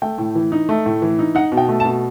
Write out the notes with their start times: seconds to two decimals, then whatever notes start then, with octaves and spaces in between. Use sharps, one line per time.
0.02 A3 G5
0.18 A2
0.35 E3
0.52 D#4
0.69 A3
0.86 A2
1.02 E3
1.19 D#4
1.35 D#4 F#5
1.52 B2
1.57 G5
1.69 A3
1.80 A5
1.85 B2